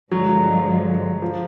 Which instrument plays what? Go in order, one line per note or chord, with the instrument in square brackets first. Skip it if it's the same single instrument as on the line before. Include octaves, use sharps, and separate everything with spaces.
[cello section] G2 D3 F3 G#3 [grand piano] F#3
[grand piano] F3